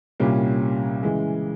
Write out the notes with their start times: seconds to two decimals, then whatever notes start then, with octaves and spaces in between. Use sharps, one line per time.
0.20 C2 A#2 G3 A#3 C#4
1.03 C#3 E3 G#3